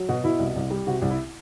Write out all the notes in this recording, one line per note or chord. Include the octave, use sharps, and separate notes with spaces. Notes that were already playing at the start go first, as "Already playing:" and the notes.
Already playing: F#3
B2 F#4
B2 E4
C2
C2
G3
C3 F#4
C2
E4